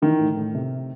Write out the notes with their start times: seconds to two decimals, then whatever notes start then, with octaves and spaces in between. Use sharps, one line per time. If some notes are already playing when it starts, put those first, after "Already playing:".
0.02 D#3 E3
0.19 A2
0.37 A2
0.55 C3